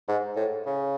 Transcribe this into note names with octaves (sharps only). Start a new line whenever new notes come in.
G#2
A2
C#3